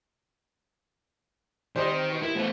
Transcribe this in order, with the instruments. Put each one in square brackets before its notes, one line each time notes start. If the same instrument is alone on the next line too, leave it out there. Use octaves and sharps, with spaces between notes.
[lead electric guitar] D#3 [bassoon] G3 [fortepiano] D#4 G4 C5
[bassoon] C4
B2
[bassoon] D#2 [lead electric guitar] E4
[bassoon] F3 [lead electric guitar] A3 B3